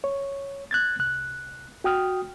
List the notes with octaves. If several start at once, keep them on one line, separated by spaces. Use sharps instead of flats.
C#5
F#6 G#6 A6
C2 F#6
F#4 G5 D#6 F6